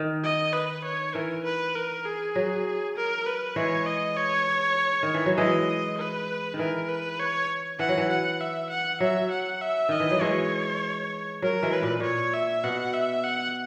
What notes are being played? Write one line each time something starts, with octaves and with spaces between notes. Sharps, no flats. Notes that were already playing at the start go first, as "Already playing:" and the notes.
Already playing: D#3
D#5
B4
C#5
E3 A#4
B4
A#4
G#4
F#3
A#4
B4
E3 G#3 C#5
D#5
C#5
D#3
E3
F#3
E3 G#3 D#5
B4
D#3
E3 A#4
B4
C#5
E3 F#5
F#3
E3
F#5
E5
F#5
F#3 E5
F#5
E5
D#3 D#5
E3
F#3
E3 G#3 C#5
F#3 A#4
E3 G#3
B4
A#2
A#2 C#5
E5
B2 F#5
E5
F#5